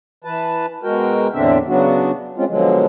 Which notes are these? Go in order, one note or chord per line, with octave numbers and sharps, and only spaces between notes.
E3 B4 A5
B2 G#3 F#4 A#4 G5
E2 A2 D3 C4 D4 E5
C#3 F#3 B3 D4 F#4
G#3 C4 C#4 F4
B2 D3 F3 F#3 G#3